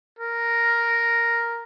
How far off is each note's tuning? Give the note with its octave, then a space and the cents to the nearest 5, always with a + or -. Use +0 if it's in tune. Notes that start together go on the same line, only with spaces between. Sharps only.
A#4 +0